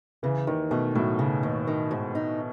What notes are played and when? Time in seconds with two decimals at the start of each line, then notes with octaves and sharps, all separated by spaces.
0.23 C#3 E3
0.47 D#2 D#3
0.71 B2 A3
0.95 A2 F#3
1.19 C#3
1.43 D#2
1.67 D#3
1.91 G#2
2.15 D#4